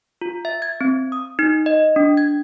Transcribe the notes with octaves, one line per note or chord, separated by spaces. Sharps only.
F4
E5
G#6
C4
D#6
D#4
D#5
D4
G#6